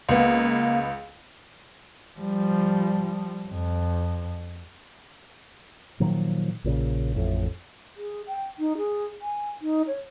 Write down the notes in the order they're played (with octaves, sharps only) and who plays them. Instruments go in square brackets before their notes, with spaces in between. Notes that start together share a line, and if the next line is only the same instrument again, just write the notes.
[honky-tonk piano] C#2 B3 [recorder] A#3
[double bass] F3 G3
F2
[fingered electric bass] A#2 D#3 F3 F#3
A#1 A#2 C#3
A1 F2 A2
[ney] G#4
G5
D#4
G#4
G#5
D#4
C#5